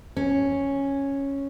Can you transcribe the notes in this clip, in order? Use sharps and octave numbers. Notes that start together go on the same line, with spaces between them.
C#4